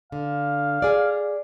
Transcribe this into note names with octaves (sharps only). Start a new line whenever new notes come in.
D3 F5
G#4 D5